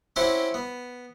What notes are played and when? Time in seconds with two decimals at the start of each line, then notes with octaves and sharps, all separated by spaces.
0.16 C4 C#4 E4 F#4 G4 C5
0.54 B3